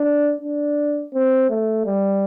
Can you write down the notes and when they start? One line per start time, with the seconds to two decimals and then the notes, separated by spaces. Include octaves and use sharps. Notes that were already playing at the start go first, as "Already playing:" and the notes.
Already playing: D4
0.41 D4
1.13 C4
1.50 A3
1.86 G3